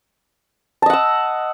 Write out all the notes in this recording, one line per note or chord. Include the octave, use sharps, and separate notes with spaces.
D#5 F#5 A5 E6